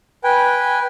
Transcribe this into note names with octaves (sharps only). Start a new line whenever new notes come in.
B4 G5 G#5